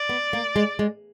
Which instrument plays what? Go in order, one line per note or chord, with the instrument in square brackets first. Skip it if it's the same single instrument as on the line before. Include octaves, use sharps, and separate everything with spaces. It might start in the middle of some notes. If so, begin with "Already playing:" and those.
Already playing: [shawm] D5
[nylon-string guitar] B3
A#3
G#3
G#3